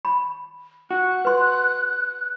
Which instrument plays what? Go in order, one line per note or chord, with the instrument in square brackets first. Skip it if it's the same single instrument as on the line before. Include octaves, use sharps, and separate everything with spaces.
[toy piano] B5
[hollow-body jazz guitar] F#4 [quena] F#6
[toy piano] B4 C6